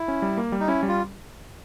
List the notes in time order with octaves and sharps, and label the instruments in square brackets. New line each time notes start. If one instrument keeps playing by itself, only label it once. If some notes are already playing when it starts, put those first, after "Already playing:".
Already playing: [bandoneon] E4
[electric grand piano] C#4
G3
A#3
G3
[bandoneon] D#4
[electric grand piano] C#4 [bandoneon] E4
[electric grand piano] G3
[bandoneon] F4